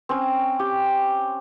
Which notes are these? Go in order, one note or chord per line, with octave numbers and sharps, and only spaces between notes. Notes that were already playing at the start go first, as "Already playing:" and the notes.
C4 C#4 C#5
G4